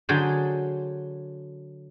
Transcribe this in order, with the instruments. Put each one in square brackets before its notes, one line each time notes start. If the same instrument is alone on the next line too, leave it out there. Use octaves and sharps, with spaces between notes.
[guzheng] D3 F#3 G#4 C5